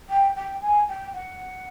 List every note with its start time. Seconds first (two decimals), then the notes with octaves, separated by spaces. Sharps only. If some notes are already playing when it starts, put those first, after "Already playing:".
0.09 G5
0.36 G5
0.62 G#5
0.88 G5
1.14 F#5